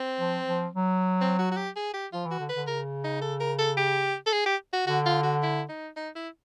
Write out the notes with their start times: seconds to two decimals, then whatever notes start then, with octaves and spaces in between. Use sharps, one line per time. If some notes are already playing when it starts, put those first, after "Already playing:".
Already playing: C4
0.20 F3
0.48 F3
0.75 F#3
1.21 C4
1.39 F#4
1.51 F#4
1.57 G4
1.76 G#4
1.94 G4
2.13 F3 F4
2.25 E3
2.31 F#4
2.40 D3
2.49 B4
2.55 D3
2.67 C#3 A#4
3.04 D#4
3.22 A4
3.40 A#4
3.59 A4
3.77 G4
4.26 A4
4.33 G#4
4.46 G4
4.73 F#4
4.87 D3 F#4
5.06 F4
5.23 F#4
5.43 E4
5.69 D#4
5.96 D#4
6.15 E4